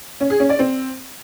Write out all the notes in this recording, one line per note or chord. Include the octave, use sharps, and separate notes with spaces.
C#4
G#4
C#4
D5
C4